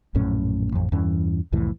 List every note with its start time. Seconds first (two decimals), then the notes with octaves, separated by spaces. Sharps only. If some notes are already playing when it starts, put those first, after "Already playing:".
0.15 A#1 F#2 A2 C#4
0.72 A1 F2
0.92 E2 G2 E3 C#4
1.52 C2 F2 A2 E3